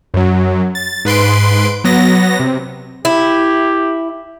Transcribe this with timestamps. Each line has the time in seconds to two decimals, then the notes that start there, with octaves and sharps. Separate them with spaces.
0.14 F#2 F#3
0.75 A6
1.05 G#2 B4 C6 D7
1.84 F#3 B3 A#6
2.39 C3
3.05 E4 G4